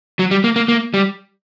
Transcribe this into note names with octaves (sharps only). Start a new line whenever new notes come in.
F#3
G3
A#3
A#3
A#3
G3